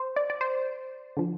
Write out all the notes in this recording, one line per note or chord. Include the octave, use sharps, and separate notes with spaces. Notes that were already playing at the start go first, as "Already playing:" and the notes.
Already playing: C5
D5
D5
C5
D3 F3